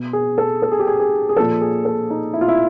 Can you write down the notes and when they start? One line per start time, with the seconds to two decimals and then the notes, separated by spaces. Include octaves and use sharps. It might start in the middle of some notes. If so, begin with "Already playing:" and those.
Already playing: B2
0.13 G#4
0.38 A4
0.62 A4
0.72 G#4
0.79 G4
0.87 G#4
1.00 G#4
1.29 G#4
1.36 F3 A4
1.40 A#2
1.61 G#4
1.85 A4
2.10 D#4
2.34 E4
2.41 F4
2.48 E4